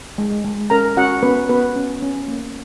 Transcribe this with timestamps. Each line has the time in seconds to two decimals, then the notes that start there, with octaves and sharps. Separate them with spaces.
0.18 G#3
0.44 G#3
0.70 C#4 A#4 A#5
0.97 C#4 F#4 F#5
1.23 B3 C#4 B4
1.49 B3 F#4 B4
1.76 C#4
2.03 C#4
2.28 A#3